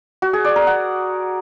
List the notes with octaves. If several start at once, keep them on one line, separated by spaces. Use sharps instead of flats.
F#4
G#4
D5
A#4
F#5